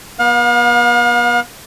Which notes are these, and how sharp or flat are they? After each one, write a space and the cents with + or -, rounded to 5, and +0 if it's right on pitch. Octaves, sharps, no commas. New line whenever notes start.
B3 -35 F5 +40